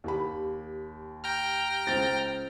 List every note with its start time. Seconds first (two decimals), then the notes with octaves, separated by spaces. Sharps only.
0.04 D#2 G4 B5
1.24 G5 A#5 F6
1.87 C#2 C5 A6